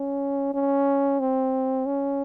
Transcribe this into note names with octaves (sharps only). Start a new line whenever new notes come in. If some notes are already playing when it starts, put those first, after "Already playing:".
Already playing: C#4
C#4
C4
C#4